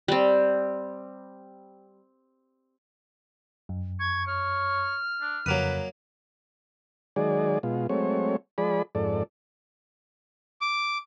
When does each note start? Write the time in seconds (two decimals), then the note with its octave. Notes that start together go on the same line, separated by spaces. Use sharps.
0.08 G3 C4
3.69 F#2
4.00 C#6 G#6
4.27 C#5 F6
5.21 D4
5.46 F2 C#3 F#3 A#3 B4 D#6
7.16 D#3 F#3 G#3 G#4 D5
7.63 B2 G#3 F4
7.89 F#3 G#3 A3 C4 C#5
8.58 F3 G#3 G#4 D5 B5
8.95 F2 G#2 A4 D5
10.61 D6